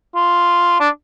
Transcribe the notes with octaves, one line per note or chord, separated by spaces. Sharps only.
F4
D4